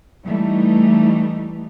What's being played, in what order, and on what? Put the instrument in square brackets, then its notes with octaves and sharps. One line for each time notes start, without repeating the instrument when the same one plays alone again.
[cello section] E3 G3 A3 D#4